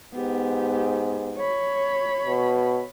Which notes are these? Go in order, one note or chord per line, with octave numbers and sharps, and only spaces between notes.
G#2 B3 G4
C#5 B5
B2